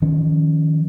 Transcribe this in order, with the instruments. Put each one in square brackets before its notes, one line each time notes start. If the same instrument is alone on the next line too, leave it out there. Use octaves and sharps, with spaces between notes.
[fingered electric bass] D#3 F3 C#4